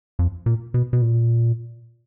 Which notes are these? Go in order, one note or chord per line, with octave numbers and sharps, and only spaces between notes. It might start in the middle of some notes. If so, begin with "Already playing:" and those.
F2
A#2
B2
B2
A#2